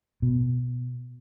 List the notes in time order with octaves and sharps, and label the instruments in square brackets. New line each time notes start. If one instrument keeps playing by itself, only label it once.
[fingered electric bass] B2